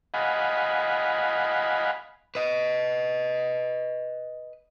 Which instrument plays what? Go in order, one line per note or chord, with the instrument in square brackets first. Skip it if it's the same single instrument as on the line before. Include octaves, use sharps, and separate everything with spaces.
[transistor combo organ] D#5 F5 F#5 G#5 B5
[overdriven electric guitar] B4 D#5